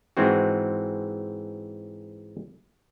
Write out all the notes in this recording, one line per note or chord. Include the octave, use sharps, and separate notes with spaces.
G#2 E3 G#3 C4 F#4